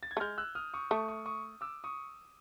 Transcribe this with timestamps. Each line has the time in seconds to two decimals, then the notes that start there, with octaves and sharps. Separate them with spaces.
0.03 A6
0.11 G#6
0.17 A3
0.20 G#3 F6 G6
0.38 E6 F#6
0.55 D#6 F6
0.74 C#6 D#6
0.91 A3 C#6 D#6
1.08 C#6 D#6
1.26 C#6 D#6
1.61 D6 E6
1.84 C#6 D#6